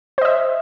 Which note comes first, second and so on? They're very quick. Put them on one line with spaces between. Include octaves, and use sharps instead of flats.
C5 D#5 E5